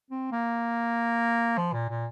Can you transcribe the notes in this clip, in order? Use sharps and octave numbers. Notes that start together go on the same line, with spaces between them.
C4
A#3
F3
A#2
A#2